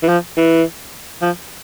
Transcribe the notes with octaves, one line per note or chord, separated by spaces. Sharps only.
E3
F3
E3
F3